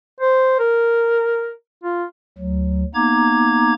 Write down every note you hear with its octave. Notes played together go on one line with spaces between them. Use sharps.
C5
A#4
F4
D2 F#3
A#3 B3 D#4 A#5 D6 G#6